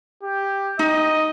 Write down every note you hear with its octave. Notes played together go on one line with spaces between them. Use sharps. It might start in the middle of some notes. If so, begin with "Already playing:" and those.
G4
D#4 D#5